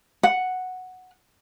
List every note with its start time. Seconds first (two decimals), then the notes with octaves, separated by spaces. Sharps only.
0.23 F#5